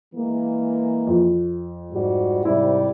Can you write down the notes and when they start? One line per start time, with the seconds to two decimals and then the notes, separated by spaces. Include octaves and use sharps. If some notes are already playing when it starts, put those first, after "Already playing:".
0.15 E3 G#3 A#3
1.07 F2
1.92 G#2 G3 F#4
2.45 G#2 C3 G3 E4